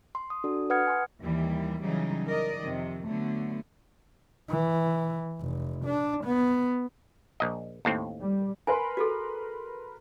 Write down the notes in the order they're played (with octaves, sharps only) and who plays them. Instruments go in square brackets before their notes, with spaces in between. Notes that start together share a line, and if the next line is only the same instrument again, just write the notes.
[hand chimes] C6
D#6
D4 F#4 A4 D5
B4 F#5 D#6 F6 G#6 C#7
G#5 C6
[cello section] D#2 E3 G3
C#3 E3 F#3 G3 D#4
A#4 D5 D#5
F2 C3 D#3
D3 F#3 A3 B3
[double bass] E3
F1
D4
B3
[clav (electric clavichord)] A#1 D#5
D#2 A2 C4
[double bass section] G3
[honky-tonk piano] A#4 B4 C6 [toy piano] G#5
[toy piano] F#4 G#4 A4